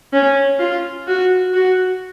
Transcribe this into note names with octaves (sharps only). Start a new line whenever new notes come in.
C#4
F4
F#4
F#4